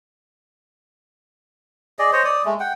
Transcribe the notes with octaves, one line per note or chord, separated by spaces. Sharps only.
G#4 D5 D#5
C5 C#5 D#5
D5 D#6
G#3 A3
F#5 G5